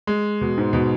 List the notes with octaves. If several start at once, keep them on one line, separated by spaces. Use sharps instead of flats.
G#3
B2
G#2
B2